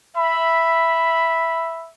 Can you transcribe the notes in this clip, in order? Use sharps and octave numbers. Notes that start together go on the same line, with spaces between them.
E5 B5